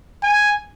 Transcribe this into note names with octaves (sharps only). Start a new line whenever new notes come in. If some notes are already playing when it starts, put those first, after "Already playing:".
G#5